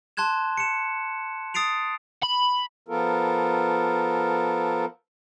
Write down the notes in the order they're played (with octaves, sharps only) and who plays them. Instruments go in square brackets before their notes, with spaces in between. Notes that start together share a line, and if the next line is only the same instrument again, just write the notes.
[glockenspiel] A5 C6 F#6 G#6 E7
C#7 E7
D#6 A6 C7 D7 F7
[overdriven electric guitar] B5
[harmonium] F3 B3 F4 A4 A#4